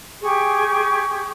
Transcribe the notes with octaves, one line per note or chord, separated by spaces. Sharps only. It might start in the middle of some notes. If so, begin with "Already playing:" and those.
G4 G#4 C#6